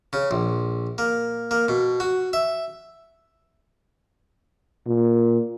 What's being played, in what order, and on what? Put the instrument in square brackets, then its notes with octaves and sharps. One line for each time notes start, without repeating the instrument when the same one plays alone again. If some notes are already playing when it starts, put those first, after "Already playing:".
[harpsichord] C#3
A#1
A#3
A#3
B2
F#4
E5
[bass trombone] A#2